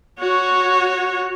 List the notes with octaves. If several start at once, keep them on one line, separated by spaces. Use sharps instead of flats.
F#4 C#5